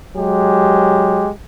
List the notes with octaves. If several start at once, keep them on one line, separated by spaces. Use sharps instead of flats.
F#3 G#3 G4